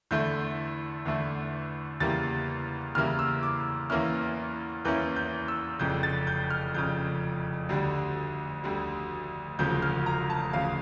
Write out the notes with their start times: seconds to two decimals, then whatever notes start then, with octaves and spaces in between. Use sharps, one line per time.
0.11 E2 D3 A3 E4 G6
1.05 E2 D3 A3 E4
2.00 E2 C#3 G3 A#3 E4 A6
2.95 E2 C#3 G3 A#3 E4 F6
3.19 E6
3.43 D6
3.90 E2 E3 A#3 C#4 E4 F6
4.85 E2 E3 A#3 C#4 E4 G6
5.16 G6
5.48 E6
5.79 F1 F2 C#3 G6
6.03 A6
6.27 G6
6.50 F6
6.74 F1 F2 C#3 G6
7.69 D2 D3 G3
8.64 D2 D3 G3
9.59 E1 D2 C#3 F3 G6
9.82 F6
10.06 A#5
10.30 A5
10.53 E1 D2 C#3 F3 F5